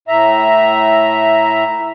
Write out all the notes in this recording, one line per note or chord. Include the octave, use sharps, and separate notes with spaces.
A2 E5 A#5